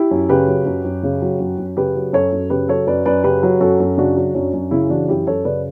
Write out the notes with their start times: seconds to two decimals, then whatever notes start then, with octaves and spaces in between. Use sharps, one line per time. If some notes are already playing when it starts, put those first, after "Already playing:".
Already playing: E4 G4
0.11 F#2
0.29 C#3 G4 B4
0.48 F#3
0.66 F#2
0.84 F#2
1.03 C#3
1.22 F#3
1.40 F#2
1.58 F#2
1.77 C#3 G4 B4
1.95 F#3
2.13 F#2 A4 C#5
2.32 F#2
2.50 C#3 G4 B4
2.68 F#3 A4 C#5
2.87 F#2 B4 D5
3.05 F#2 B4 D5
3.24 C#3 G4 B4
3.43 F#3
3.60 F#2 F#4 A4
3.80 F#2
3.97 C#3 D4 F#4
4.17 F#3
4.35 F#2 D4
4.53 F#2
4.71 C#3 C#4 E4
4.90 E3 D4 F#4
5.09 F#2 E4 G4
5.27 F#2 A4 C#5
5.45 C#3 B4 D5